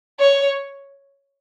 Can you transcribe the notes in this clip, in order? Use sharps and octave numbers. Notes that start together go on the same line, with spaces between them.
C#5